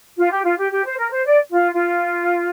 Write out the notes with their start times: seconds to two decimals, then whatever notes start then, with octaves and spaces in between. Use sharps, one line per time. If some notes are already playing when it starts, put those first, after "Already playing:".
0.17 F4
0.30 G4
0.43 F4
0.57 G4
0.71 G4
0.84 C5
0.97 A#4
1.11 C5
1.24 D5
1.51 F4
1.72 F4